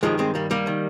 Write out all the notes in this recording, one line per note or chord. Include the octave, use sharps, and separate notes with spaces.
G2 D#3 F3 G#3
G#3 C4
G3 A#3
G3 A#3
D#3